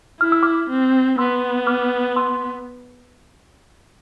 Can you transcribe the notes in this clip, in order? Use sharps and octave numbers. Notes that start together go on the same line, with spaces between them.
E4 F6
E6
D6 F6
C4
B3 C6 E6
D6 F6
C6 E6